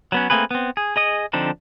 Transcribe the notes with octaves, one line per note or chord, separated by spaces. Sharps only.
F#3 B3 C#4
A3 A#3 C4 G#4 B4
B3 C4
G#4
G#4 D#5 D#6
D3 F3 C4 D4 D#4